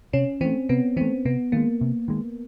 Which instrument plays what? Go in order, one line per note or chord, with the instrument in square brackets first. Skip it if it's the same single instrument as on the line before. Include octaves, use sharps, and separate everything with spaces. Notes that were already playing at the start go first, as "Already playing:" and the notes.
[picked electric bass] C3 [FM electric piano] C#4
[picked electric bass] E3 A3 [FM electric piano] C4
[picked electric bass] C3 [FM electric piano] B3
[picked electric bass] E3 A3 [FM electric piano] C4
[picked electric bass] C3 [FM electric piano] B3
[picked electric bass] D#3 G#3 [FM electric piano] A#3
[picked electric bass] C3
D#3 G#3